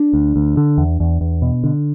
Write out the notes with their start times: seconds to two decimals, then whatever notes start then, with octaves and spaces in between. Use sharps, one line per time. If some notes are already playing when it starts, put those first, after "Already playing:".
Already playing: D4
0.13 D2
0.36 D2
0.57 D3
0.78 E2
1.00 E2
1.21 E2
1.42 B2
1.64 D3